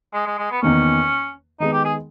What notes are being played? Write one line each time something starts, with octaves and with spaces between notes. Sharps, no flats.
G#3
G#3
G#3
B3
E2 D#3 A#3 C#4
D#3 G#3 B3 D#4
G4
G#4